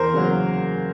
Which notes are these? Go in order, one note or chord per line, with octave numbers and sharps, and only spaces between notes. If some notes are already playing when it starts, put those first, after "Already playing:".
Already playing: E2 A#4 C5
C#3 F#3 A#3